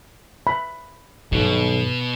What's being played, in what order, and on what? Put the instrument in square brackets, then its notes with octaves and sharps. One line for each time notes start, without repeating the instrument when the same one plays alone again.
[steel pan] B5
[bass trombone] B1 [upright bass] G2 D#3 [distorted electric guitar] B2